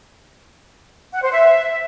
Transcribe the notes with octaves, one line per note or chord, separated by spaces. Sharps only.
F#5
C5
E5